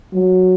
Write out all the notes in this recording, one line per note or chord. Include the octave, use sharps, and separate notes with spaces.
F#3